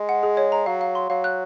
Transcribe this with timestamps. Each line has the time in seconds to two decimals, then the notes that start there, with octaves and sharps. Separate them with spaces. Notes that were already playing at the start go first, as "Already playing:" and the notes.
Already playing: G#3
0.09 F#5
0.23 G#4
0.37 C#5
0.52 A#5
0.66 F#3 F5
0.81 F5
0.95 C6
1.10 F#3 F5
1.24 F#6